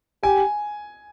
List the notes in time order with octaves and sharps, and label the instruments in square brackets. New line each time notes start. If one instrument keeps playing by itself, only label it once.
[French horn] G4 [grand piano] G#5